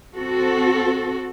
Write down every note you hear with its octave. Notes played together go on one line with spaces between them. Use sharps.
C4 F#4 A4